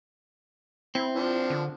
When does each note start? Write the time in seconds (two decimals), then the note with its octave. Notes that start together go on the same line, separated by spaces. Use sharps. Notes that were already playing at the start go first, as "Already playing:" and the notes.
0.95 C4 E4
1.16 F3 D4
1.50 D3